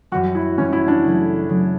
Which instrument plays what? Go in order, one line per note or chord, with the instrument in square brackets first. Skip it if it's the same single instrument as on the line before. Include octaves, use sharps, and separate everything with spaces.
[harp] F#2 E3 G3 [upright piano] F#4
[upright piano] E4
[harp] F#2 E3 G3 [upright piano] C#4
[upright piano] E4
D4
[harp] C#3 F#3 A3
C#3 F#3 A3